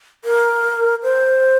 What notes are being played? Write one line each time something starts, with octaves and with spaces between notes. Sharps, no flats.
A#4
C5